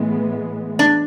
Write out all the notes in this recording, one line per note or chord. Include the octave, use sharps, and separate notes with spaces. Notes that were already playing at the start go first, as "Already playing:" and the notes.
Already playing: A2 E3 G#3 B3
D4